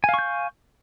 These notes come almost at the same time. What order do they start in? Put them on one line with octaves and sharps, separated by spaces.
G#5 F5 C#6 G6